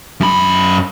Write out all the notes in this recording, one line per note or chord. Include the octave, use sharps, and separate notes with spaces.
F#2 B5